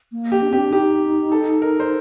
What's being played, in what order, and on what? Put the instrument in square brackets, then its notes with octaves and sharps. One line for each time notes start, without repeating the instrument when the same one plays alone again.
[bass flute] A#3
[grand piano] G4
[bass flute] D4
[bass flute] C4 [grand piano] G4
[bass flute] D4
[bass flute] D#4 [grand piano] G4
[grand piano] A4
A#4
C5